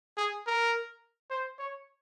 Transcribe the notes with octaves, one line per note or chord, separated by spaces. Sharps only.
G#4
A#4
C5
C#5